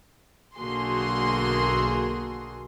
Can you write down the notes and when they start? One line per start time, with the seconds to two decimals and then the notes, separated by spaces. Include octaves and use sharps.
0.57 B1 D3 A#3 F#4 G#4 C6